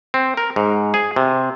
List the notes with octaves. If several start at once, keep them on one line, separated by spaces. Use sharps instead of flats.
C4
A#4
G#2
G#4
C3